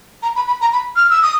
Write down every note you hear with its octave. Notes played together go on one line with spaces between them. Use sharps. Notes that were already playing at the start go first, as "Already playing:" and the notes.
A#5
B5
B5
A#5
B5
F6
E6
D#6